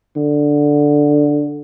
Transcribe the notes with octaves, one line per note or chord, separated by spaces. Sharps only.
D3